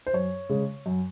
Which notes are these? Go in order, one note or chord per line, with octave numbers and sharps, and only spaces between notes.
C5
F#2 C#5
C#3 G#3
F#2